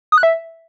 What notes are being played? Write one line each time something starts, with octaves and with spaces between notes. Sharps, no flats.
D#6
F#6
E5